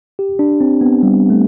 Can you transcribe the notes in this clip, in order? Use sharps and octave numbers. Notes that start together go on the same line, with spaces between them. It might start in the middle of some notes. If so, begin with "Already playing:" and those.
G4
D4
C4
B3
G3
A3